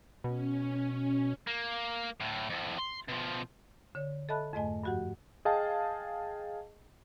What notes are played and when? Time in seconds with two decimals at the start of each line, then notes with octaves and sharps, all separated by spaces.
0.24 B2 C#4
1.47 A#3
2.21 D2 A2
2.50 F2 A2
2.79 C6
3.09 B2 F3
3.95 D3 C#5
4.29 A4 D#5 E5 A5 B5 F#6
4.53 F2 G#2 A3 D#5 G#5
4.84 G2 F3 F#4 G4 F#5
5.45 G#4 D#5 F5 G5 A5